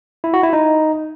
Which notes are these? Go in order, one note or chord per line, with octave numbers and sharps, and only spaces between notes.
E4
F#4
E4
D#4